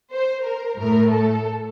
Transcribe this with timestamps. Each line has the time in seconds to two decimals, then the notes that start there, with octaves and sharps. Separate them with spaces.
0.12 C5
0.45 A#4
0.79 A2 A3 A#4
1.12 A4